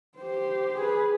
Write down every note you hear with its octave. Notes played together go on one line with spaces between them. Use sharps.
G4 C5
G#4 B4